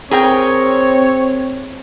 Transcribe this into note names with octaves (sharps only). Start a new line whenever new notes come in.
C4 G#4 A#4 C#5 G5